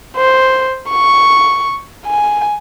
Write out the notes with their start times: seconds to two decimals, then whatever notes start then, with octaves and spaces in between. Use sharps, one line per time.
0.17 C5
0.90 C#6
2.06 G#5